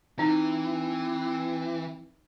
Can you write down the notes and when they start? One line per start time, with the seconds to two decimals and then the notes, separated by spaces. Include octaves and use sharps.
0.19 E3 C4 D#4